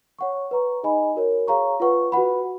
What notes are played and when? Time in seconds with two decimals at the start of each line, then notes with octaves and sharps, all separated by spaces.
0.19 C#5 F#5 C#6
0.51 B4 F#5 A#5 C#6
0.83 D#4 G#4 D#5 G#5 B5
1.15 F#4 A#4 C#5
1.47 G#4 C#5 F5 A#5 C#6
1.80 F4 B4 F#5 C#6
2.12 F#4 B4 F#5 B5